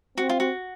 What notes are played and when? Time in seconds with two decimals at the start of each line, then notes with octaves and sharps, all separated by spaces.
0.17 C4 F#4
0.29 F4
0.40 F#4